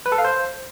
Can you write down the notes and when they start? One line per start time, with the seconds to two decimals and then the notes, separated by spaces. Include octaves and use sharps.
0.06 B4
0.12 A4
0.18 F5
0.25 C5